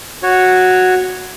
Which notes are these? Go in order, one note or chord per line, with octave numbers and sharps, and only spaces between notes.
F#4 C#5